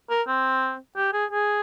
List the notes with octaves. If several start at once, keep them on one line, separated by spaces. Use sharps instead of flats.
A#4
C4
G4
G#4
G#4